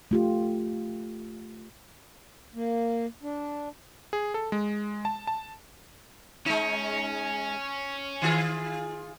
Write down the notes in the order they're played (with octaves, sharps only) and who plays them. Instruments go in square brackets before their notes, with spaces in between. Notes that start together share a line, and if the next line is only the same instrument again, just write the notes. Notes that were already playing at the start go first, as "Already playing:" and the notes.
[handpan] A3 F4 G4
[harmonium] A#3
D4
[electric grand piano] G#4
A4
G#3
A5
A5
[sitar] G#3 D#4 [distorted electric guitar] C#4
[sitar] D#3 F4 G#4